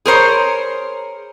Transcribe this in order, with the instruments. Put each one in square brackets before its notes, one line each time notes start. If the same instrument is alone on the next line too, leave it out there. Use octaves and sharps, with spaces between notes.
[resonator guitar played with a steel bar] G#4 A#4 C5 C#5